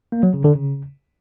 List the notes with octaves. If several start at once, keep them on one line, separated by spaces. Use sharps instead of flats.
A#3
F#3
C#3
D3
C#3